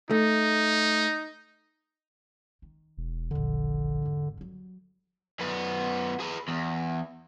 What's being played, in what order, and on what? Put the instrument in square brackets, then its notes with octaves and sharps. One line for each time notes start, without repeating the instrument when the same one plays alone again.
[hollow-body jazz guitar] A3 [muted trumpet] D#4
[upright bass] D#3
[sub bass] E1
[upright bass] D#1 A#1 [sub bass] D3
[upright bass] G#1 E2
F#3 G3
[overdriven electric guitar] F#2 B3
G#4 B4
E2